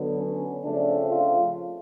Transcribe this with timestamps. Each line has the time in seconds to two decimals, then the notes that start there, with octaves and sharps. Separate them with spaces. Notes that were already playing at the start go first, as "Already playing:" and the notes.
Already playing: D3 F#3 B3
0.18 C#4
0.64 C#3 F3 A3 C4 D4
1.11 F4